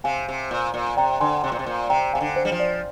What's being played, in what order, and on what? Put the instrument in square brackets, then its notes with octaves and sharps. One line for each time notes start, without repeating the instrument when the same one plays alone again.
[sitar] C3 [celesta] F5 G#5
[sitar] C3
A#2
A#2
[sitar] C3 [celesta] G5 A#5
[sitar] D3 [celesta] G#5 C6
[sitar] C3
A#2
C3
A#2
[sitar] C3 [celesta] G5 A#5
[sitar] C3 [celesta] F5 G#5
[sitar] D3
[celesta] C5
[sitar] G3
F3
[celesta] D5